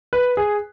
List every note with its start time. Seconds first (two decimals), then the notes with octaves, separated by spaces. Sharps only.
0.13 B4
0.37 G#4